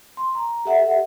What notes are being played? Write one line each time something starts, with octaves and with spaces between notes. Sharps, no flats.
C6
A#5
G4 A4 E5 F#5